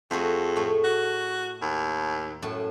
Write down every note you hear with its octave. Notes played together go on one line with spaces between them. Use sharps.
F2 A3 F#4 G#4
A2 A3
F#4
D#2
F#2 A2 A5